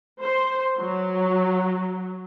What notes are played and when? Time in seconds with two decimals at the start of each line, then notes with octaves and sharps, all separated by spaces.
0.22 C5
0.79 F#3